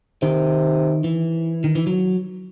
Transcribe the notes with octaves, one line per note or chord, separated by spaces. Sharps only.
C3 D#3
E3
D#3
E3
F#3